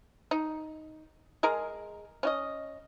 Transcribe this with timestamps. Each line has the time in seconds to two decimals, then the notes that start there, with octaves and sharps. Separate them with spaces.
0.31 D#4
1.43 G#3 G#4 A#4 A#5
2.23 C#4 F#4 D#5